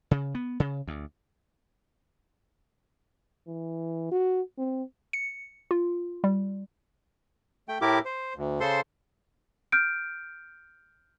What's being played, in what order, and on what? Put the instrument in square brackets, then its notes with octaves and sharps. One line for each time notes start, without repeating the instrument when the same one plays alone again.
[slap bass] C#3
B3
C#3
D2
[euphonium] E3
F#4
C4
[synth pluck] C#7
F4
G3
[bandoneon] A3 G5
A2 A3 E4 G4 A#4 D6
C5
D2
C#3 A4 C5 C6
[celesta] F6 G6 D7